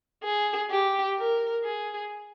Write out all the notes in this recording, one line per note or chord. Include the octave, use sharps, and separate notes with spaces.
G#4
G4
A#4
G#4